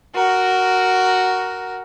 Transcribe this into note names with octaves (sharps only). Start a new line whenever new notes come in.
F#4 A#4